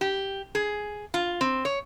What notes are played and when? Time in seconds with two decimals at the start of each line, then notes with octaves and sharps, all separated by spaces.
0.01 G4
0.55 G#4
1.14 F4
1.41 C4
1.65 C#5